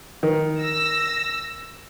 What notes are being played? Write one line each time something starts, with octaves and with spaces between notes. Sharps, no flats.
D#3
E6 A#6